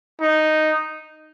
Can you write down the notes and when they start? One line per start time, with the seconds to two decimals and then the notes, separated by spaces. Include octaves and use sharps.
0.21 D#4